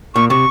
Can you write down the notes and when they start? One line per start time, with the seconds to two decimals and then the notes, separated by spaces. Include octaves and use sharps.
0.15 A#2 C#6
0.30 C3 C#6